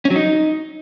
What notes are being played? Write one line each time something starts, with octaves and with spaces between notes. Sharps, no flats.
C#4
F#3
D#4